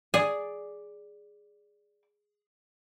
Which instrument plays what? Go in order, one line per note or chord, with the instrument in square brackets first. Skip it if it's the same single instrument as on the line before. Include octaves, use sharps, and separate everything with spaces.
[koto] G#4 [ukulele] D5